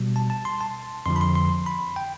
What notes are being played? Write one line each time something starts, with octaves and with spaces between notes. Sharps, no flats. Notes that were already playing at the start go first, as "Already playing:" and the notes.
Already playing: B2 G3
A5
A5
C6
A5
F2 D3 F3 C6
B5
C6
C6
B5
G5